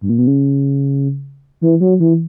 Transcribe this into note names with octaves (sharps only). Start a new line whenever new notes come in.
G2
A#2
B2
C#3
E3
F#3
E3